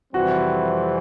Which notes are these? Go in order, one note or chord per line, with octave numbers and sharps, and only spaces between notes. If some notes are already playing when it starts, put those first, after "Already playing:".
F2 C3 E3 G3 C4 F#4